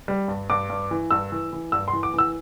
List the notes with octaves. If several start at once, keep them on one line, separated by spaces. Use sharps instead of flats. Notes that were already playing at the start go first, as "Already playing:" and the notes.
G3
G2
G2 D6
G2
E3
G2 E6
E3
E3
G2 E6
C6
E3
D6
E3 E6